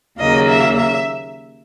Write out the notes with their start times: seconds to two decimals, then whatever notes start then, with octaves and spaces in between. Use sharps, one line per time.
0.19 D#2 C#3 F#3 A#3 D#5
0.48 E5
0.76 E5